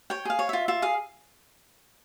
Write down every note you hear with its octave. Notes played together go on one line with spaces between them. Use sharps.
C#5 G5
G#4 F5
C#5
F4 E5
F4 E5
G#4 F5